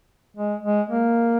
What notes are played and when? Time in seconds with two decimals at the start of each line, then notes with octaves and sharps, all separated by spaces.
0.37 G#3
0.63 G#3
0.90 A#3